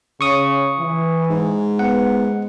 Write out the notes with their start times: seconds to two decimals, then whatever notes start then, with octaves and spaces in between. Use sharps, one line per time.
0.21 C#3 C#6 D#6
0.80 E3
1.30 G#2
1.79 B3 F#5